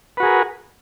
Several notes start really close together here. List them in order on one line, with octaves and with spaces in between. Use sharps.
B4 F#4 G#4 A#4